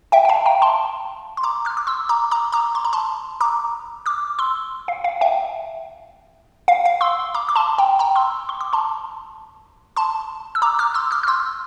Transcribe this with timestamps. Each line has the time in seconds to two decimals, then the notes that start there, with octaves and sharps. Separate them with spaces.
0.12 E5 G5
0.25 G5
0.29 F5 A5
0.46 G5 A#5
0.62 A5 C6
1.37 C6
1.43 A#5 D6
1.65 D6 F6
1.77 D6
1.87 C6 E6
2.09 A#5 D6
2.31 A#5 D6
2.52 A#5 D6
2.75 C6
2.85 A#5
2.93 A5 C6
3.41 A#5 D6
4.06 D6 F6
4.39 C6 E6
4.88 F5
5.04 F5
5.21 E5 G5
6.68 F5
6.85 F5
7.01 C6 E6
7.34 A#5 D6
7.49 D6
7.56 A5 C6
7.78 G5 A#5
7.99 G5 A#5
8.16 C6 E6
8.49 C6
8.61 D6
8.73 A5 C6
9.96 A5 C6
10.55 E6
10.62 A#5 D6
10.79 D6 F6
10.94 C6 E6
11.11 D6 F6
11.23 F6
11.27 C6 E6